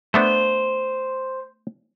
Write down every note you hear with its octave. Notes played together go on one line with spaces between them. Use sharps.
A3 B3 D4 C5